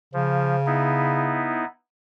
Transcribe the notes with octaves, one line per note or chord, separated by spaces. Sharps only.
C#3 F3
B3 D#4 E4